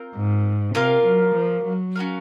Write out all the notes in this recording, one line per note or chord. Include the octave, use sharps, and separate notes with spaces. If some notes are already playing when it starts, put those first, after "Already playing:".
Already playing: C4 F4 A#4
G#2
C3 A#3 F4 A#4 F5
F#3
F3
F#3
C#4 F#4 A#4 F5